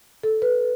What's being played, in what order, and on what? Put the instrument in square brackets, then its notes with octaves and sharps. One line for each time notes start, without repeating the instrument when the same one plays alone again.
[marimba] A4
B4